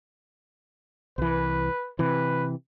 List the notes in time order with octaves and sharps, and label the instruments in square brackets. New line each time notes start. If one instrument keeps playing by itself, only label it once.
[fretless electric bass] C2 E3 [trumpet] B4
[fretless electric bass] C3 E3 [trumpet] B4